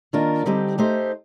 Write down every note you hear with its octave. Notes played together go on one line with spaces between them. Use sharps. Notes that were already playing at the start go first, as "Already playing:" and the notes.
D#3 A#3 D4 F4 A#4
D3 G3 C4 D#4 G4
A3 D#4 G4 C5